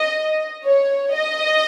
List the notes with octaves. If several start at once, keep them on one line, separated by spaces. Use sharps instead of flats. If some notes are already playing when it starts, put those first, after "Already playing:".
Already playing: D#5
C#5
D#5